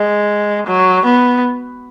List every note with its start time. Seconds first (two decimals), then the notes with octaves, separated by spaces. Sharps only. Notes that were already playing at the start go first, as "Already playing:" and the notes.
Already playing: G#3
0.67 F#3
1.05 B3